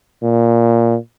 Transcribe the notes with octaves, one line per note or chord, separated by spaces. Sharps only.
A#2